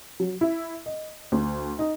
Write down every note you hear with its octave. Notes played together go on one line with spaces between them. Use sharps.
F#3
E4
D#5
D2
D#4